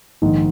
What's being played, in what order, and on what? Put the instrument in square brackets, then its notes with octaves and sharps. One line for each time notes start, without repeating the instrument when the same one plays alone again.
[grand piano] A#1 G#2 D#3